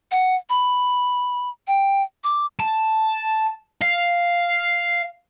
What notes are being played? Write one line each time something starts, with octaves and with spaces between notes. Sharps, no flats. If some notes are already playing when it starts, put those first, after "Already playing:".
F#5
B5
G5
D6
A5
F5